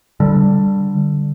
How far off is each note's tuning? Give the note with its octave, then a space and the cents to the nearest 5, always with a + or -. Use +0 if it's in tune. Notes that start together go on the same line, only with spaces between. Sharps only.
D3 +0 G3 +0